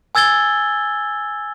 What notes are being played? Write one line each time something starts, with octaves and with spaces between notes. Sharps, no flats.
G#5 E6 G#6 A6 G7